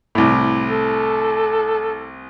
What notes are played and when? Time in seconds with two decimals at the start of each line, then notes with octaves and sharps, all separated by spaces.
0.15 C2 A2
0.70 A4